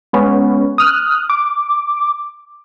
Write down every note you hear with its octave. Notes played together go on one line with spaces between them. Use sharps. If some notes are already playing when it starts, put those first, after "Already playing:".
G#3 B3 C#4
D#6 F6 F#6
D6